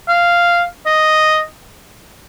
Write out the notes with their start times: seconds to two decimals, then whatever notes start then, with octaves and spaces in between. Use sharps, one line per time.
0.08 F5
0.86 D#5